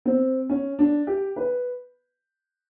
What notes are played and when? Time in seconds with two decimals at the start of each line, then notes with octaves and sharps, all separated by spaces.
0.06 C4
0.49 C#4
0.79 D4
1.07 G4
1.36 B4